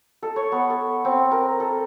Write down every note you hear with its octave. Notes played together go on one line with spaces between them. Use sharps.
A4
C#5
B3
A4
C4
A#4
A4